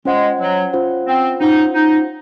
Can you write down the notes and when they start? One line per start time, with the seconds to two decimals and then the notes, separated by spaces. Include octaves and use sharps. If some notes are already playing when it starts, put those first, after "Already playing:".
0.05 G#3 C#4 F4 C5 F#5
0.40 F#3
0.73 C#4 F4 C5 F#5
1.07 C4
1.40 C#4 D#4 F4 C5 F#5
1.74 D#4